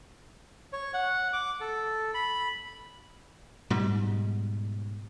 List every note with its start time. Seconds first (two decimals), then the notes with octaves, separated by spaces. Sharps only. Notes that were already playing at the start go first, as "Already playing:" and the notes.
0.73 C#5
0.94 F#5
1.33 D6
1.61 A4
2.14 B5
3.70 G#2 B2 G3